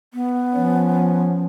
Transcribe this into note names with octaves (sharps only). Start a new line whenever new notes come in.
B3
F3 C#4